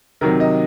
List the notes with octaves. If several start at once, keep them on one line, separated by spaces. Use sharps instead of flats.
C3 D#3 F#3 A#4
D#5